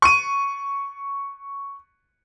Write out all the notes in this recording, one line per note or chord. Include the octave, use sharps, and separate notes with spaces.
C#6 D#7